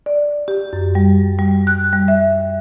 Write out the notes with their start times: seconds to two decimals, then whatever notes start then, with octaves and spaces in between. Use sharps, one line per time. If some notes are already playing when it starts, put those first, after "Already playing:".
0.06 D5
0.48 G4
0.73 F#2
0.95 G3
1.39 G3
1.67 F#6
1.93 G3
2.08 E5